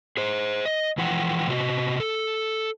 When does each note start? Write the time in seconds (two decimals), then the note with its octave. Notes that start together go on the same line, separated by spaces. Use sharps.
0.17 G#4 C5
0.65 D#5
0.97 E3 F3 F#5 G5
1.48 C3 F#4 D#5
2.00 A4